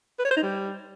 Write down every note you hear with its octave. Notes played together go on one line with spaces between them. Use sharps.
B4
C#5
C5
D#4
G3